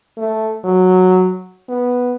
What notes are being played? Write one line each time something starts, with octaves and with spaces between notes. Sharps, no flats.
A3
F#3
B3